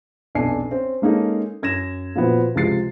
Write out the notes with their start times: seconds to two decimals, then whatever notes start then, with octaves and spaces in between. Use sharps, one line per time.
0.35 F1 B1 D4 G#5 C7
0.71 C4 C#4
1.02 G#3 A#3 C#4 D#4 A4
1.63 F#2 G#6 A#6 E7
2.15 A#2 F3 F#3 B3 C4
2.55 C#2 C3 F3 G#3 A6 C7